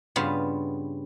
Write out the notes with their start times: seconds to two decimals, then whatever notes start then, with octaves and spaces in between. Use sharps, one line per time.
0.16 G2 C#3 B3 F4